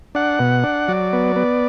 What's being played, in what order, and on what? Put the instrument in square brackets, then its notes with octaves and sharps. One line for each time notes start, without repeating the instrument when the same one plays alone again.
[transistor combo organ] D4 F#5
B2
D4
F#3 D5
B3
B3